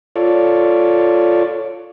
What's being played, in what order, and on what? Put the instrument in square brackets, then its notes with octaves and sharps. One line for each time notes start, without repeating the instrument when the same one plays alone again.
[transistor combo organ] F4 A4 C#5 D5